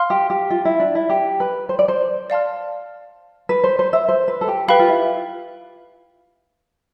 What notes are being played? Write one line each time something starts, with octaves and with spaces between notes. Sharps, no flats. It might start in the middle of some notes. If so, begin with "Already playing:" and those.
Already playing: F5 C6 F6
G4
G4
F4
E4
D4
E4
G4
B4
C5
D5
C5
D5 F5 A5 C6 F6
B4
C5
C5
C5 E5
C5
B4
A4
G4
G4 B4 F5 B5
F4
E4